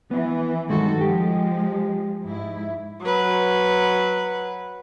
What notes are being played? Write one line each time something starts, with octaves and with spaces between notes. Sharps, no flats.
E3 B3
G2 D#3 F#3 G#3 F#4 A4
F3 G#3 G4
G#2 E4
F#3 B4